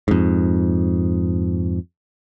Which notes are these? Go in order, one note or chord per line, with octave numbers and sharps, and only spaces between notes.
F2 G#2